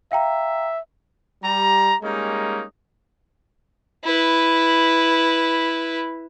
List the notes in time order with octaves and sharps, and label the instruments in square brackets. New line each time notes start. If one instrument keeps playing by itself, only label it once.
[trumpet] E5 [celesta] F5 G5 A#5
[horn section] G3 A#5
G3 G#3 A#3 C#4 D#4
[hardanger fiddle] E4 B4